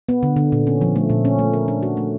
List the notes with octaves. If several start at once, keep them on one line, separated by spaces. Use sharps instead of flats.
B3
D3
D3
A#2
C#4
F3
A3
A#2
C#4
A3
A#4
D4
F#4
A3